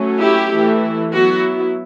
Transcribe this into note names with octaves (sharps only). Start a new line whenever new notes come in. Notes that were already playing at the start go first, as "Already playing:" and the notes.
Already playing: F#3 A3 C#4
E4 G4
E3 A3 E4
F#3 B3 E4 F#4